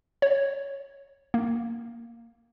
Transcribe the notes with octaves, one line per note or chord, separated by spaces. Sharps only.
C#5
A#3